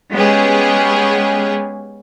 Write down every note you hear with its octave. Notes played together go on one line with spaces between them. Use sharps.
G#3 B3 C#4 G4 G#4